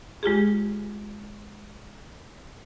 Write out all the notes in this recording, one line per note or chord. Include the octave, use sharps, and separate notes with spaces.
G#3 F4 G4 G#4